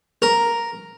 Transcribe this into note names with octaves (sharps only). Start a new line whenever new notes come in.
A#4